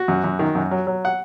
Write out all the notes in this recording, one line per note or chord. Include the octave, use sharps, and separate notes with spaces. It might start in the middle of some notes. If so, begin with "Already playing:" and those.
Already playing: F#4
F#2
F#2
D#3
F#2
F#3
F#3
F#5